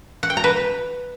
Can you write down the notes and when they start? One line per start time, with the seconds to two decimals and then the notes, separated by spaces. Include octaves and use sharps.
0.23 F#5
0.30 G5
0.37 A#5
0.44 B4